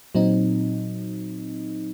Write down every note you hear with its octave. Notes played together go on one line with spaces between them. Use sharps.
A#2 F#3 C4 D#4